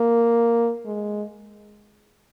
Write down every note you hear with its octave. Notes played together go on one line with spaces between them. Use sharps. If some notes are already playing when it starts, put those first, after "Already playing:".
Already playing: A#3
G#3